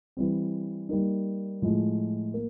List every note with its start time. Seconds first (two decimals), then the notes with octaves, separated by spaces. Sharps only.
0.17 E3 G3 C4
0.89 G3 A#3 D#4
1.62 A2 F3 G#3
2.34 A#3